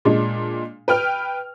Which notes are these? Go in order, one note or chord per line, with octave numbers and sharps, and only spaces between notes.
A#2 G#3 D4
B4 G5 F6